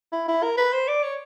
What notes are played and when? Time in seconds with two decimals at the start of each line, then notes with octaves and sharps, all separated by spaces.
0.13 E4
0.28 E4
0.43 A#4
0.57 B4
0.73 C5
0.88 D5
1.03 C#5